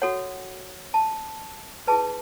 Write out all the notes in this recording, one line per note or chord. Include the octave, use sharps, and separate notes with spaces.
F#4 A4 C#5 F#5
A5
E4 G#4 B4 A5